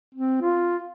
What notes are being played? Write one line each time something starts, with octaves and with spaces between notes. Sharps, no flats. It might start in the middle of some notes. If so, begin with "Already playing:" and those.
C4
F4